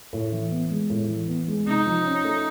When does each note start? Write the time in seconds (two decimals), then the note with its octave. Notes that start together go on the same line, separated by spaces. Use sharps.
0.13 A2
0.32 E3
0.51 B3
0.70 G#3
0.90 A2
1.08 E3
1.28 B3
1.48 G#3
1.67 C3 D#4
1.86 F3
2.05 C#4
2.25 A3